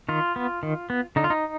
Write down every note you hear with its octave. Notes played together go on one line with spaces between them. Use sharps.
D#3 F4
B3
D#3
B3
D3 D#4
F4
D#4